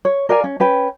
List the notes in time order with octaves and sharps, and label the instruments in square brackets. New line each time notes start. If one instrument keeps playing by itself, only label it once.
[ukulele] C#5
A#4 D5 F5 G#5
C#4
C#4 B4 G5